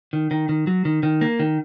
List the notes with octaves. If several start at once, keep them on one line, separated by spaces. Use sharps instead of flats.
D#3
D#3
D#3
F#3
D#3
D#3
A#3
D#3